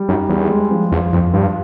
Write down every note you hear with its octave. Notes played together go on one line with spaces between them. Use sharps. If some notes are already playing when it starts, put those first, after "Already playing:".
Already playing: G3
F#2 D#4
E2 G3
G#3
F3
E2 F3
F2 F3
G2 F4